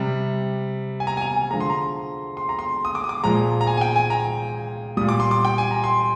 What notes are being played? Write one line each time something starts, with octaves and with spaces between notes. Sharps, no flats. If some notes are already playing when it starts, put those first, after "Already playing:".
Already playing: C3 G3
G#5
A#5
G#5
A#5
G#5
D3 F3 G#3 A#5
C6
A#5
C6
A#5
C6
D#6
D6
D#6
D6
A#2 F3 G#3 A#5
A#5
G#5
G#5
G5
G#5
A#5
A#2 G3 D#6
D6
C6
D6
G5
G#5
A#5
C6